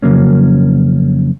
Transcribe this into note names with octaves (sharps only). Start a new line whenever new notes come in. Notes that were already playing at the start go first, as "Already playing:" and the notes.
F2 C#3 F#3 A#3 C#4